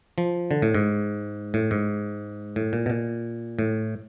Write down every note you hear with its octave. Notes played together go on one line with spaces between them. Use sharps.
F3
D3
A2
G#2
A2
G#2
A2
A#2
B2
A#2
A2